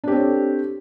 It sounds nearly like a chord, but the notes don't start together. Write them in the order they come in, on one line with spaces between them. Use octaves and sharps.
D4 G4 C4 C#5 A4